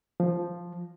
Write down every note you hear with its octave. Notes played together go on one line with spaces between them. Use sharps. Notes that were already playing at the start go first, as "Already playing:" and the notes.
F3